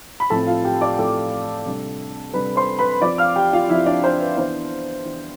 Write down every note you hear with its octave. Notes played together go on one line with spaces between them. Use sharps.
B5
A2 F3 C4 A4 A5
F4 F5
G4 G5
D5 D6
G5
A2 F3 C4 A4 A5
C3 G3 D4
C3 G3 D4 B4 B5
C5 C6
B4 B5
F3 C4 F4 D5 D6
F5 F6
G4 G5
F4 F5
F3 C4 E4 F4 E5
D4 D5
C5
B4
E3 B3 D4 C5
E3 B3 D4